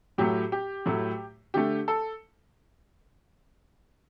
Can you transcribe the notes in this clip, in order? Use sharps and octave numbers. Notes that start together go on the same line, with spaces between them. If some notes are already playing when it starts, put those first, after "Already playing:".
A2 F#3 A3 G4
G4
A2 F#3 A3
D3 A3 G4
A4